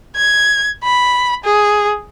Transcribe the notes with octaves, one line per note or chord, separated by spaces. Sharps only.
G#6
B5
G#4